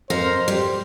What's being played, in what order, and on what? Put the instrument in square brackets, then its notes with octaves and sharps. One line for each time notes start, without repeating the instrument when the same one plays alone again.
[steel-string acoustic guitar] F2 A#4 F5 [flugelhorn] C5
[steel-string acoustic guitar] G3